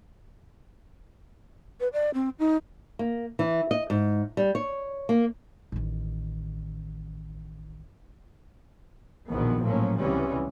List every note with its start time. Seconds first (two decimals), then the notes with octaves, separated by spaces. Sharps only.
1.80 B4
1.93 D5
2.14 C4
2.39 D#4
2.99 A#3
3.39 E3
3.71 D#5
3.90 G#2
4.37 G3
4.55 C#5
5.09 A#3
5.72 A1 D#3
9.30 A#1 E2 B2 D#3 F3 B3
9.62 A2 F3 F#3 A#3 C#4
9.98 C#2 C3 E3 G3 B3 C#4